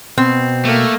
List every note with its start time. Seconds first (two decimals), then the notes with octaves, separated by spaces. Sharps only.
0.18 B2 C4
0.65 A3 A#3